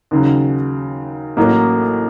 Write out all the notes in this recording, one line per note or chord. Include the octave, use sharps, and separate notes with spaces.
D#2 C#3 F#3
A1 A2 F#3 A#3